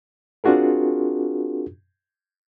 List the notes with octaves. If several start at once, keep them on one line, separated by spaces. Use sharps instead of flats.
C4 D4 F4 F#4 G#4 A#4